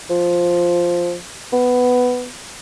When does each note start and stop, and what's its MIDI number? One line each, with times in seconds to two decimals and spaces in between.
0.10 1.16 53
1.52 2.29 59